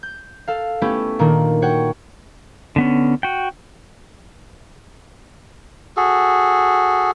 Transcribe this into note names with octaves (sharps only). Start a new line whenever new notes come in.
G6
A4 F5
A3 B3 C#4 E4 G4
A#2 D#3 A#3 D4
F#4 C#5 F#5 G5
D3 B3 C#4
F#4 G5
F#4 G#4 A4